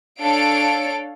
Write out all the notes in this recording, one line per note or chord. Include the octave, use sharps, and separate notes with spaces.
D4 A4 C#5 F5 D7